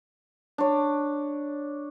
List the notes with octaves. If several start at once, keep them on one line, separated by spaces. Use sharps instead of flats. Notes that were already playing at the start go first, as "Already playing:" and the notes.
D4 C#5